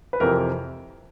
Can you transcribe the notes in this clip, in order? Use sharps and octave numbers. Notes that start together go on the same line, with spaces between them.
B4
F2 C3 E3 A#4